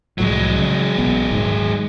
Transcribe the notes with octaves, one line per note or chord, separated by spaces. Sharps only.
C2 A2 F3 F#3 G#3
C#3
A#1 B3
D#1 G#2 D#3